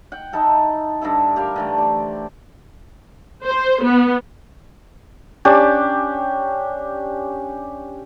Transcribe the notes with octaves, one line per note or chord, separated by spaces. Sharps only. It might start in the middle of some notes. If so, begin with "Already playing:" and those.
F#5 G5
D#4 E4 A4 F#5
G2 D3 E4 A4
G4 A#4 D5 F5
D3 E3 A3
C5 D5
C5
B3
C#4 D4 G4